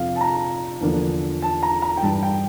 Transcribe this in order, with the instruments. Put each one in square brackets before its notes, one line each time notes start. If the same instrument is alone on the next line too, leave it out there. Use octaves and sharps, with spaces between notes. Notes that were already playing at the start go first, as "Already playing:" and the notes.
Already playing: [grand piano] F2 C3 F3 F5
A5
A#5
E2 D3 F3 A#3 D4
A5
A#5
A#5
G5
G2 E3 G3 A5
G5